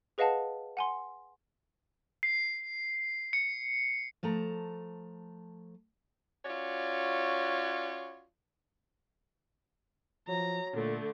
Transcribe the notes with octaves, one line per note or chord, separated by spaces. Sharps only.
G#4 B4 D#5 F5 F#5 A5
F#5 G#5 C6
C7
C#7
F3 A3 A5 A#5
C#4 F4 F#4 C#5 D5
F3 F#3 A#5
A#2 D3 A3